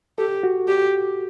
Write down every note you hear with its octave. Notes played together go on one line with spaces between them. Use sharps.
G4 A4
F#4
G4